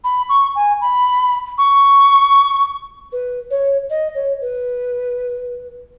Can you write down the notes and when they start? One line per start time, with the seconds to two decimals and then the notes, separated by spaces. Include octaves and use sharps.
0.04 B5
0.29 C#6
0.55 G#5
0.81 B5
1.58 C#6
3.12 B4
3.51 C#5
3.90 D#5
4.15 C#5
4.41 B4